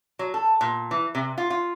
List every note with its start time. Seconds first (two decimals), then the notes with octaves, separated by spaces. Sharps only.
0.19 F#3
0.34 A4
0.61 A#2
0.91 E3
1.15 C3
1.38 F4
1.50 F4